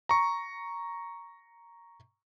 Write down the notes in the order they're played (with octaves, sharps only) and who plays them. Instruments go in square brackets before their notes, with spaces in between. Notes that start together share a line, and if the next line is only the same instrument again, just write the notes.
[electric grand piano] A#5 C#6